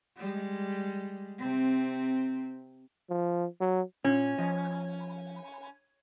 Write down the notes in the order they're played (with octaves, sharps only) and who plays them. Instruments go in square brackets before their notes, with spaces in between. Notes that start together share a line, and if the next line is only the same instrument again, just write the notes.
[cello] G3 G#3
C3 C4
[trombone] F3
F#3
[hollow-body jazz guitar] A#2 F4 [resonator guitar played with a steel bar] C#4
[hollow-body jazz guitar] F3 D#5